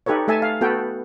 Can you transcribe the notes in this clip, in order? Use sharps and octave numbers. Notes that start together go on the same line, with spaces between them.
D#4 G4 A4 B4 C#5
A3 A4 E5 G#5 A5
F5
B3 F#4 A4 B4 G5